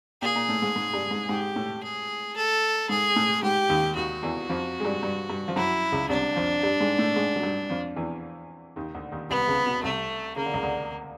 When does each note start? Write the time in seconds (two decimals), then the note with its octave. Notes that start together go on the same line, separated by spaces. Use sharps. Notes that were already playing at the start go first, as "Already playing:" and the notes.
0.22 A#2 A#3 G#4
0.35 A#2 A#3
0.49 A2 A3
0.62 G#2 G#3
0.76 G#2 G#3
0.93 G2 G3
1.11 G#2 G#3
1.29 G#2 G#3 G4
1.56 A2 A3
1.83 G#4
2.36 A4
2.89 G#2 G#3 G#4
3.16 A2 A3
3.43 G#2 G#3 G4
3.69 D#2 D#3
3.96 D#2 D#3 F#4
4.23 E2 E3
4.50 F2 F3
4.80 G#3
4.85 G2 G3
5.03 G2 G3
5.29 G2 G3
5.48 F3
5.56 F#2 F#3 E4
5.92 C#2 C#3
6.09 C2 C3 D4
6.36 F2 F3
6.63 G2 G3
6.81 G#2 G#3
6.99 A2 A3
7.16 G#2 G#3
7.36 F#3
7.43 G2 G3
7.70 F2 F3
7.96 E2 E3
8.76 D#2 D#3
8.95 D2 D3
9.12 D#2 D#3
9.30 C2 C3 B3
9.47 C#2 C#3
9.66 B2
9.83 C2 C3 A3
10.36 C#3 A#3
10.45 D3
10.54 C#2 C#3
10.63 D2 D3